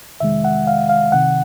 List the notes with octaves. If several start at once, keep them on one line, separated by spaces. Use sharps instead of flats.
F2 C3 D#3 G#3 E5
F#5
F5
F5
C2 C3 D#3 F#5